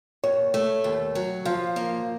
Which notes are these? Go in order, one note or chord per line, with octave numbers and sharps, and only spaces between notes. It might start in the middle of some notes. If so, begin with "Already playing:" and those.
D#2 C#5
A3
D#2
F#3
F3 F5
A#3